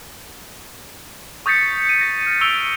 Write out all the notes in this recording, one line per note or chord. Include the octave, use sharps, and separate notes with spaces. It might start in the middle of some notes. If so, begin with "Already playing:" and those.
C#6 D#6 G6 A6 B6 C#7
D#7
A#6
F6 A6
C#6 E6 D7 F7 G7